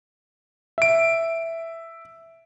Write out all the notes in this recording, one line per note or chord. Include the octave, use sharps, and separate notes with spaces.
E5 D7